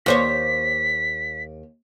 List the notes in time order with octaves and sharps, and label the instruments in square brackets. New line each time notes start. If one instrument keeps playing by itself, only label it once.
[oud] D#2 C5 C#5 [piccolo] B6